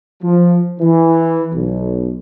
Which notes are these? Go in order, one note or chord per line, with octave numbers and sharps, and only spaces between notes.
F3
E3
B1